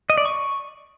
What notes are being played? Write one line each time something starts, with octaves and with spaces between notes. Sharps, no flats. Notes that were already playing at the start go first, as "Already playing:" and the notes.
D#5
D5
C#6